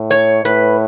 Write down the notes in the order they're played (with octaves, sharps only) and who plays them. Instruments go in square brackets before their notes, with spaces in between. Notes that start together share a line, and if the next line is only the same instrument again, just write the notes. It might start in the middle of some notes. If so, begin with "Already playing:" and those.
Already playing: [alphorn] A2
[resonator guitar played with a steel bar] C#5
[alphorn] A2 [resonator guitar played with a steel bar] B4